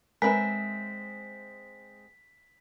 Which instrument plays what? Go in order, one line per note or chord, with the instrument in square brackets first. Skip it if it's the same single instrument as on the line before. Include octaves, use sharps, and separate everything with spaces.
[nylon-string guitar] G#3 C4 E5 [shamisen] A#4 B4 [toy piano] C#5 G#5 [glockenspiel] B6